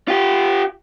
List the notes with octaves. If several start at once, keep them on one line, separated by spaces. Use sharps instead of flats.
F4 G4